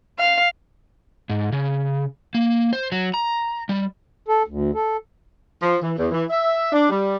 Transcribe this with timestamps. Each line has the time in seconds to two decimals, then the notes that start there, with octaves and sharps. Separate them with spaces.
0.20 F5
1.29 G#2
1.52 C#3
2.35 A#3
2.73 C5
2.92 F#3
3.14 A#5
3.69 G3
4.28 A4
4.47 D2
4.74 A4
5.62 F3
5.82 E3
5.98 E2
6.12 E3
6.30 E5
6.72 D4
6.89 G3